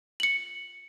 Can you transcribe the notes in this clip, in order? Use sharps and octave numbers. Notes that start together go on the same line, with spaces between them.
C#7 F#7